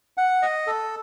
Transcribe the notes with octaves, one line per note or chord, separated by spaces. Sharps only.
F#5
D#5
A4